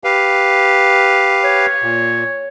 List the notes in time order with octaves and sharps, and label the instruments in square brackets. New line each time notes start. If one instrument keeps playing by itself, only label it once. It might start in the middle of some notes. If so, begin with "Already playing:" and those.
[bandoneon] G4 B4 F5
[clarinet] C#5
[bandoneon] A#2